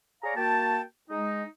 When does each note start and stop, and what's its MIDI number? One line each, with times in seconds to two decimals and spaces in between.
0.23 0.34 68
0.23 0.34 73
0.23 0.34 74
0.23 0.34 77
0.23 0.34 82
0.36 0.82 58
0.36 0.82 66
0.36 0.82 79
0.36 0.82 81
1.10 1.44 56
1.10 1.44 63